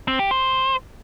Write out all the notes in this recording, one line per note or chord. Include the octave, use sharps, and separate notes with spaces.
C4
G4
C5